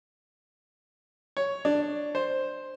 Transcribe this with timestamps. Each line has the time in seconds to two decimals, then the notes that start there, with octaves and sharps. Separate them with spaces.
1.37 C#5
1.65 D4
2.15 C5